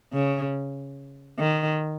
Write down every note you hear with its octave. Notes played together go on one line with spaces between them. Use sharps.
C#3
D#3